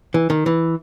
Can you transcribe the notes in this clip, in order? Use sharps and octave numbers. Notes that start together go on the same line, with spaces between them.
E3
D#3
E3